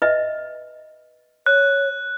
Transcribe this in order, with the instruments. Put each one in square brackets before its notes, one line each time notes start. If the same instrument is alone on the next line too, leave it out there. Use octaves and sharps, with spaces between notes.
[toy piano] B4 D#5 E5
[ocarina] C#5 [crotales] F#6